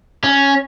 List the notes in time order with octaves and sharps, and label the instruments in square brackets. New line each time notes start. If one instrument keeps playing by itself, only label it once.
[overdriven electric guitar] C#4